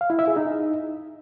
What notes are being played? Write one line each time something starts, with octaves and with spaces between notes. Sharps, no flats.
F5
E4
E5
G#4
D#4